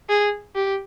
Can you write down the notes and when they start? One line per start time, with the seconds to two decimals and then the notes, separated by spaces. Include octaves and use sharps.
0.09 G#4
0.55 G4